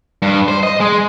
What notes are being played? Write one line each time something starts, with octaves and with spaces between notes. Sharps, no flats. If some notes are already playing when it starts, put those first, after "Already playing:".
G2
C5
D#5
G#3